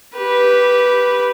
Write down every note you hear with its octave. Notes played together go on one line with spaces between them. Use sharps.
G4 B4